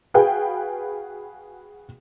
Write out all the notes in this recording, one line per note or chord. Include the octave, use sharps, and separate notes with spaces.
F#4 G#4 B4 F5 G5 G#5